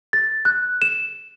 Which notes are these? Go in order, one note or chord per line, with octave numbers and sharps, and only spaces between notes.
A6
F#6
E7